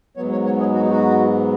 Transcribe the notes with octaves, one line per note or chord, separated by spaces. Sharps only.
G#2 F#3 B3 C#5
C#5
C#5
G#4
F#4
D#4
F#4